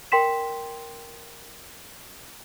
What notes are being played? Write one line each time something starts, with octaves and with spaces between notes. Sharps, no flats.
A#4 G5 C6 B6 E7